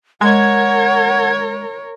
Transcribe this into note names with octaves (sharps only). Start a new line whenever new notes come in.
G#3 A#4 C#5 F#5 G#6